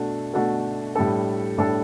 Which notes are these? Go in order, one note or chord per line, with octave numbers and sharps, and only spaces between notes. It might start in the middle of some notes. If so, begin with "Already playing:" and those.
Already playing: B2 A3 D4 F#4 A4
B2 A3 D4 F#4 A4
A2 G3 D4 A4
A2 G3 D4 A4